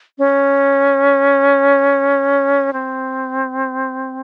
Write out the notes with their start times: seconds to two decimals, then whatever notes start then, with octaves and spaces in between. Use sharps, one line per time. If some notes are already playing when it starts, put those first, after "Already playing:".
0.18 C#4
2.73 C4